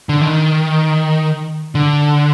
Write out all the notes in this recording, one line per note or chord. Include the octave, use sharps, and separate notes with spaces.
D3
D#3
D3